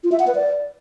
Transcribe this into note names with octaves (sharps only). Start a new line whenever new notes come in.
F4
E5
F#5
B4
D5